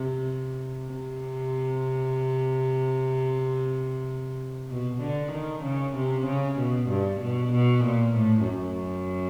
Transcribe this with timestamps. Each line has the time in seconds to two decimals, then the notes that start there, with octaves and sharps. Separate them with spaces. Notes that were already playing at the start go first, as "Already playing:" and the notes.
Already playing: C3
0.93 C3
4.70 B2
5.01 D3
5.33 D#3
5.64 C#3
5.96 C3
6.27 C#3
6.59 B2
6.90 G2
7.22 B2
7.53 B2
7.85 A#2
8.16 A2
8.47 F#2